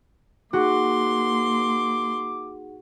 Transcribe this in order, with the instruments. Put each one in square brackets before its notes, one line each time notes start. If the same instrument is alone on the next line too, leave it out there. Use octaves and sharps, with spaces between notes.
[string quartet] A#3 C6 [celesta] D#4 G#4 F#5 [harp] F#4 [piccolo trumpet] D6